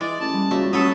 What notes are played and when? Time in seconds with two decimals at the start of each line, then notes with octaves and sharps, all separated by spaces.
0.01 E3 G#3 D5
0.20 A1 A5
0.34 G3
0.51 C#2 G3 A3 A#3 F#4
0.73 A1 F#3 E4 A4 D#6